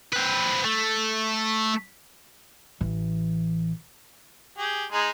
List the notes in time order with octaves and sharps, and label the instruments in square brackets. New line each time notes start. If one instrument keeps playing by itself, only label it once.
[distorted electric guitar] C4 B4
A3
[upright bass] A1 E3
[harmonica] G4 G#4
G#3 D#4 G#4